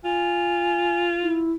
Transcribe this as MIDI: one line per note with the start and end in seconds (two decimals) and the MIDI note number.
0.05 1.55 65
0.05 1.03 80
1.23 1.52 64